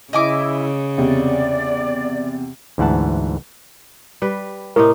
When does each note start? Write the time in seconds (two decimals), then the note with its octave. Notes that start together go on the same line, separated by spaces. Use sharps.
0.13 C#3 E4 D#5 G#5 D6
0.98 E2 C3 D5
2.78 D2 G#2 E3 F#5 A5
4.22 G3 B4
4.76 A2 C3 D#4 A#4